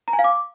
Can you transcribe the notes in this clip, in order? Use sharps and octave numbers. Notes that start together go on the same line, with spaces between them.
A#5
G#5
F5
D6